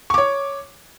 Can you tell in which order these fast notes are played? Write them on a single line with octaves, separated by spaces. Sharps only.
C#6 D6 C#5